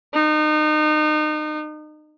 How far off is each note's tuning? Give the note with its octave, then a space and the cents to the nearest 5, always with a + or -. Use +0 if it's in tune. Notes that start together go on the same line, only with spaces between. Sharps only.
D#4 -30